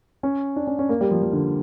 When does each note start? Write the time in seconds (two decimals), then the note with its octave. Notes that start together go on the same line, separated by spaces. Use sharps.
0.23 C#4
0.56 D4
0.67 C#4
0.79 C#4
0.89 A#3
1.01 G3
1.11 F3
1.22 F3
1.33 D3